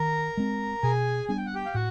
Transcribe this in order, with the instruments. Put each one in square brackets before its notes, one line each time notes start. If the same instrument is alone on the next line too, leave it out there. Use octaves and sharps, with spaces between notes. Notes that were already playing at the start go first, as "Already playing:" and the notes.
Already playing: [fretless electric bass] D#3 [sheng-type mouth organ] A#4 A#5
[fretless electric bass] G#3 C4
[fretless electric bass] B2 [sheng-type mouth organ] G#4 G#5
[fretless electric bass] G3 B3 D4 [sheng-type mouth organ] G#5
[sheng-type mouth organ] G5
F#5
G4 G5
F5
[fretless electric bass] A2 [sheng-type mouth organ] F#4 F#5